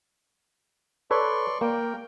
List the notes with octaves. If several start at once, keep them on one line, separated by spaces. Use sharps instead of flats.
A4 B4 C#5 D5 C6 C#6
A#3 A#4 G5